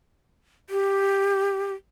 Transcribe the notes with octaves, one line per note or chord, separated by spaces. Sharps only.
G4